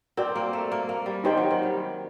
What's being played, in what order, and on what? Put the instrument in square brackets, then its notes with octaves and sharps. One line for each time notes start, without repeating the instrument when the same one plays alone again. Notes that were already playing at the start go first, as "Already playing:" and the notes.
[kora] C4 [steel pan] F#4 A#4 D5 G5
[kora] A#3
A3
A#3
A#3
G3
[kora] D#3 [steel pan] D#4 G4 C5 G5
[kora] F#3
D#3
G3